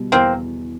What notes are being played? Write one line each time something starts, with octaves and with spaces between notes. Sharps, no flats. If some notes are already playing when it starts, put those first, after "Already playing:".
Already playing: B2 G3
E2 A#3 C4